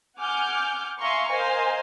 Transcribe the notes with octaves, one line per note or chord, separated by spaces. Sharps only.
F#5 G#5 D6 F6 G6
E5 F5 G#5 A#5 C6 C#6
A#4 C5 D#5 F5 G#5